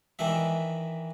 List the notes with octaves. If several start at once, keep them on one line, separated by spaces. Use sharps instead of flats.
D#3 E3 D4 E5